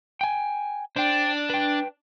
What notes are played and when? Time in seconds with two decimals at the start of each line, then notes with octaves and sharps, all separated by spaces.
0.21 G5 G#5
0.96 D4 C5 G5
1.50 B4 G5